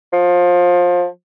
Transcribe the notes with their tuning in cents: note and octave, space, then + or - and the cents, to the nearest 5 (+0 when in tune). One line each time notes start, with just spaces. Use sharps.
F3 +25